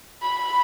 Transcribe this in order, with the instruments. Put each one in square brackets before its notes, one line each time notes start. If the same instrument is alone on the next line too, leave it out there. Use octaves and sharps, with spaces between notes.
[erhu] B5